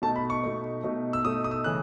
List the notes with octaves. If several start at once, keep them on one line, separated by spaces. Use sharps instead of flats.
B2 A3 D#4 A5
B5
C#6
B2 A3 D#4
B2 A3 D#4
E6
B2 A3 D#4 D#6
D#6
E6
C#3 E3 A3 C#4 F#6